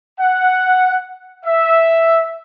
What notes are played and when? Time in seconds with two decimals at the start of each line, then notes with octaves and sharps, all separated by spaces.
0.19 F#5
1.45 E5